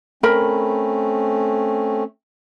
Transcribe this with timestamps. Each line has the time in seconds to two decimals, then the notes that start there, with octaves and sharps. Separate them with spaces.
0.23 A3 C4 C#4 A#4 B5